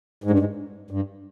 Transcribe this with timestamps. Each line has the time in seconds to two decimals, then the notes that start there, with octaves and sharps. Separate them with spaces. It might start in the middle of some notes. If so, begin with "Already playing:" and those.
0.24 G#2
0.31 G2
0.39 G#2
0.91 G2